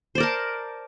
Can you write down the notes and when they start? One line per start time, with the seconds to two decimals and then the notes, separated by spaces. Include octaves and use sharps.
0.15 C5
0.18 D5
0.20 A#4
0.23 A5